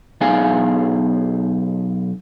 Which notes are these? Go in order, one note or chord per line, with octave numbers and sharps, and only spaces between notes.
B1 B3 D#4 G#4 F5 G#5